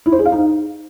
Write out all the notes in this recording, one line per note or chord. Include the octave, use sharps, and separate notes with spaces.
E4
C5
G#4
F5
D#4